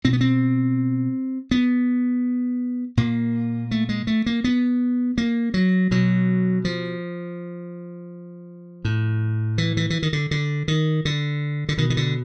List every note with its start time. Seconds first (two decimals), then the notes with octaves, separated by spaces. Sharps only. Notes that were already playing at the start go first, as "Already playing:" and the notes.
0.04 B2 C4
0.13 B3
0.21 C4
1.51 B3
2.97 A#2 A#3
3.71 A3
3.89 G#3
4.07 A3
4.26 A#3
4.44 B3
5.18 A#3
5.54 F#3
5.91 B2 F#3
6.65 F3
8.85 A2
9.58 E3
9.77 E3
9.90 E3
10.02 D#3
10.13 D3
10.31 D3
10.68 D#3
11.05 D3
11.69 D3
11.78 B2 D#3
11.90 D#3
11.97 D3